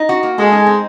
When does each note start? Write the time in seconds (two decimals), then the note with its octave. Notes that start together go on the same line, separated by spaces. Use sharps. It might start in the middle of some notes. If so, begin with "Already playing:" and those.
Already playing: D#4
0.09 F#4
0.23 A#3
0.38 G#3 A4
0.52 D#4
0.67 C4